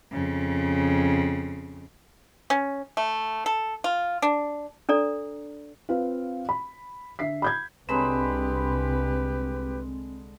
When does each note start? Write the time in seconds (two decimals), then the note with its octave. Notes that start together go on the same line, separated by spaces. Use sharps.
0.11 F2 C#3
2.50 C#4
2.97 A3
3.46 A4
3.84 F4
4.22 D4
4.89 D4 A4 D5 A#5
5.89 C4 F4 B4 F5
6.49 B5
7.19 D3 E5 B6 C7
7.42 B5 G6 G#6
7.89 C2 D3 G#3 C4 G4 B4 B5